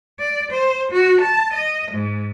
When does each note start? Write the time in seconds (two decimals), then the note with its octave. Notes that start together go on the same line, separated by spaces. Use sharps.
0.19 D5
0.49 C5
0.90 F#4
1.19 A5
1.53 D#5
1.91 G#2